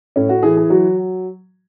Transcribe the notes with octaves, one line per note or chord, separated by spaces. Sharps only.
A2 C#4
F#4
E3 G#4
G#4
F#3 F#4